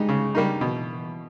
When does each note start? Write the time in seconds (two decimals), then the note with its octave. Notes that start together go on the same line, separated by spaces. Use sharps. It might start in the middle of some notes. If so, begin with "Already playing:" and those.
Already playing: G3 G#3 D#4
0.09 C#3
0.35 G3 A#3 D#4
0.61 B2 E3